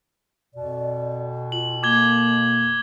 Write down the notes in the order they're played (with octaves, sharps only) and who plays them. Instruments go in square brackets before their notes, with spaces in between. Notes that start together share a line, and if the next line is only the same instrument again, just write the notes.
[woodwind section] F2 B2 [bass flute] D5
[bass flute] F4 [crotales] F#7
[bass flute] A#3 [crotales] D6 G#6 G7